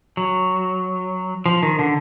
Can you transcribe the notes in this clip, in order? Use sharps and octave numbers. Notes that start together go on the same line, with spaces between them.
F#3
F3
D#3
D3